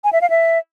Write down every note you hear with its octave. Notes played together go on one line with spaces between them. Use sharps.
G#5
E5
F5
E5